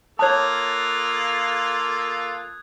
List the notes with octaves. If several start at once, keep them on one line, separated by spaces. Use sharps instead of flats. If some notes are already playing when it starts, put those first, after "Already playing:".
A#3 F4 A4 C#5 A5 D#6 F#6 G#6